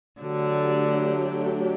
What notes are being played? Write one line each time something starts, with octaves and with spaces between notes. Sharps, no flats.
D3 F#3 A3 D4 G4